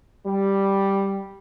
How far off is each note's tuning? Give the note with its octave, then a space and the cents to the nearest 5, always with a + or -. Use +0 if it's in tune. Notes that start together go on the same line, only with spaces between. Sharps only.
G3 +0